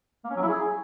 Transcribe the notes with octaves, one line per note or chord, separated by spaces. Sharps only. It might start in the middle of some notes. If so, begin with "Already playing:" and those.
A#3
C#4
F#3
E4
G#4